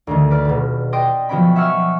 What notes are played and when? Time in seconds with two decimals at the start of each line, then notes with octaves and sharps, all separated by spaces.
0.07 D2 D3 D#3
0.30 B4 D5 F6
0.45 D#1 B2
0.93 D5 D#5 G5 C6 D#6
1.29 F3 F#3 B3 C#4 G5 B5
1.55 E5 F#5 G#5 C#6 E6 F6